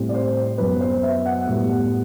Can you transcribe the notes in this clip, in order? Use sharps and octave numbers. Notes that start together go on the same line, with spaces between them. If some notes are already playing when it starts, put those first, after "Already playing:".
Already playing: A2 G3 C4
D5
C5
F#2 F#3 B3 B4
C5
E5
F#5
A2 G3 B3